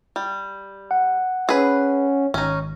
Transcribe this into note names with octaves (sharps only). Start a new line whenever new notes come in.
G3
F#5
C#4 G#4 B4
G#1 C#4 D#4